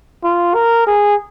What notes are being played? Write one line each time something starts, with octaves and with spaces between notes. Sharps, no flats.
F4
A#4
G#4